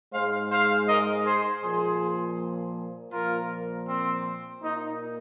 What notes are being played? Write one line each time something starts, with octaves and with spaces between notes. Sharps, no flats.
G#2 G#3 C5 F5
C5 F5
A#4 D#5
G#4 C5
A#2 F3 A#3 G#4 C5
A#2 F3 A#3 F4 A#4
C4
A#2 A#3 D#4